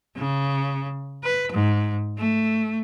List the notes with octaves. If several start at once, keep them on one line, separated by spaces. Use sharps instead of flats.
C#3
B4
G#2
A3